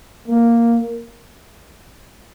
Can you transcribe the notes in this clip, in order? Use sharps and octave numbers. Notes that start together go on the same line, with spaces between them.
A#3